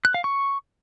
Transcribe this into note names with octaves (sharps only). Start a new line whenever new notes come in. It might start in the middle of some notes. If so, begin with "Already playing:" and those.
F#6
F5
C#6